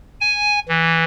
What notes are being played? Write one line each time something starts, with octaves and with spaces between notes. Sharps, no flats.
G#5
E3